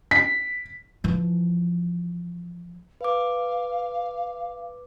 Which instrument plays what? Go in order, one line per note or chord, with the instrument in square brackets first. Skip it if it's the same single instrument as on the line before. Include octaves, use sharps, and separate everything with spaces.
[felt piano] B6
[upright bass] E3 F3
[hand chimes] B4 D6 [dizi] F5